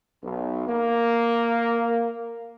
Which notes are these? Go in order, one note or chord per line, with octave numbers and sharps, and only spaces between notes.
B1
A#3